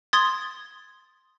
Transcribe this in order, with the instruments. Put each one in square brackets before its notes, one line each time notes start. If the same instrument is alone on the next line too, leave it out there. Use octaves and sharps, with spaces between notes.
[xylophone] C6 D#6 G#6 A6